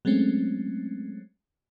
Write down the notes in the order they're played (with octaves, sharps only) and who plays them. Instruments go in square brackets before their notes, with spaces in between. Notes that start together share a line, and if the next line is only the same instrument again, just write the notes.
[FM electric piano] F#3 G#3 A3 C4 C#4